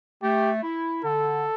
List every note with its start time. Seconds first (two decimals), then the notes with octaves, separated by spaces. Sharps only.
0.23 A3 G4
0.63 E4
1.04 D3 A4